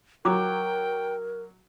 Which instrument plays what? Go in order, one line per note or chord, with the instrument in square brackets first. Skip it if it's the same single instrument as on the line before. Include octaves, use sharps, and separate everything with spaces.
[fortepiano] F#3 [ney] A#4 [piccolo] G5 [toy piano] A#5 D6